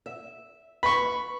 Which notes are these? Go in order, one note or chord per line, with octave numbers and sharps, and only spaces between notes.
E5
B4 B5 C#6